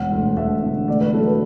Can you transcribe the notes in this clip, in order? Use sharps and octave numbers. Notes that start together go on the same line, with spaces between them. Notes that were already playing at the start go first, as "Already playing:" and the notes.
Already playing: E1 F#5
D2
E1 E5
D3
A3 D5
B4
F#3 A4
B4